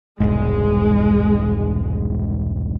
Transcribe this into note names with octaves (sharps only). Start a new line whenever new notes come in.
E1 C2 G#2 G#3